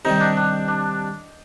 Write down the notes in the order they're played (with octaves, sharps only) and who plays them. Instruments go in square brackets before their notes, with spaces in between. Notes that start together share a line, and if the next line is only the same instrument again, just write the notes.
[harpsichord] C3 D#3 G3 [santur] D#4
[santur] D4
D4
D4